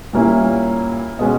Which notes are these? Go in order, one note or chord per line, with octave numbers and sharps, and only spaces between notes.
A#2 G3 A#3 C#4 E4
B2 G#3 C#4